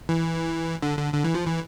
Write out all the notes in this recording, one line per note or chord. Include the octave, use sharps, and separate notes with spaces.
E3
D3
D3
D3
E3
F3
E3